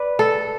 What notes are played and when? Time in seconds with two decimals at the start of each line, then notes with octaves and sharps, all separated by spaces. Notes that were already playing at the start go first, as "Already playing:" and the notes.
Already playing: B4 D5
0.19 A4